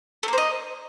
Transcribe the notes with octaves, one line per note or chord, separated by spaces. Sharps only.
A3 A#3 C5 D#5